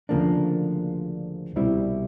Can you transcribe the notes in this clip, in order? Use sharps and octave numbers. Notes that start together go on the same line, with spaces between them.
D2 C#3 F3 A#3 D4
C2 B2 G3 C4 E4